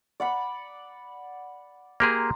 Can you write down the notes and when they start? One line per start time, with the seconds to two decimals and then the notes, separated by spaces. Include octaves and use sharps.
0.20 D5 F#5 B5
2.00 A#3 G4 G#4 A#5 C6